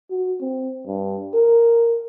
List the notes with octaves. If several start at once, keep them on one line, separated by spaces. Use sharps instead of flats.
F#4
C4
G2
A#4